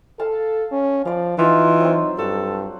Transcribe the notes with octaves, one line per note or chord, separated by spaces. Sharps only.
A4 F5 A5
C#4
F3 D5 F5
E3 D#4 F4
F#3 C4
G2 F#4 A4